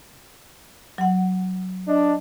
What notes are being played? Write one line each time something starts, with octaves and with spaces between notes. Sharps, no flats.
F#3 F#5
D4 D#5